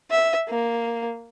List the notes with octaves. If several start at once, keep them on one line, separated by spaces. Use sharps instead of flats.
E5
A#3